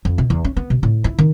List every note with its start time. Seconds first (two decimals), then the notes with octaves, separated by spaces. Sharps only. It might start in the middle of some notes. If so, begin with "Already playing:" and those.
0.05 F2
0.18 B2
0.30 E2
0.45 C#4
0.57 B3
0.70 B2
0.83 A2
1.04 E4
1.19 D#3